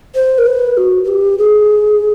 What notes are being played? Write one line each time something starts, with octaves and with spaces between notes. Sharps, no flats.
C5
A#4
B4
F#4
F#4
G4
G#4